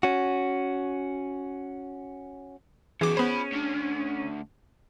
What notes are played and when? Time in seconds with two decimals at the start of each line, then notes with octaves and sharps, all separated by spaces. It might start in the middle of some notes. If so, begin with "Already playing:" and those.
0.03 C#4 F#4
3.01 F#2 B2 E3 G#4 D6
3.17 B3 C#4 F4 C5 B5
3.52 D2 D4